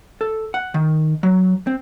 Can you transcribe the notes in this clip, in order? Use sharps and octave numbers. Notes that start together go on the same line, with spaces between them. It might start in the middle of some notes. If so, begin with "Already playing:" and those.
A4
F#5
D#3
F#3
C4